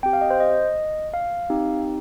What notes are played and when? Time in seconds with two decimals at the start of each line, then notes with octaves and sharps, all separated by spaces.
0.03 C4 G4 G5
0.13 F5
0.21 D#5
0.30 C5
0.40 D#5
1.14 F5
1.50 C4 D#4 G4